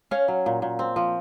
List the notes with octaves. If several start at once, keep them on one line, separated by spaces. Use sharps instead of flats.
C#4 C#5 F5
F#3
A#2
A#2
C4
F3